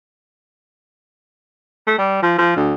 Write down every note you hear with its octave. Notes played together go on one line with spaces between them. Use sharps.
A3
G3
F3
F3
D2